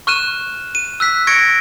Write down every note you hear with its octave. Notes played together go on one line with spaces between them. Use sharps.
C#6 F6 F#6 D#7 E7
D#7
E6 F#6 B6
C#6 G#6 A#6 C#7 D7